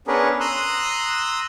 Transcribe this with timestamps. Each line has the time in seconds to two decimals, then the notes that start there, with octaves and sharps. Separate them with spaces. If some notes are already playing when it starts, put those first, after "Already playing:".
0.07 B3 C#4 D4 G#4 A#4 B4
0.40 A#5 C6 D#6 E6 F#6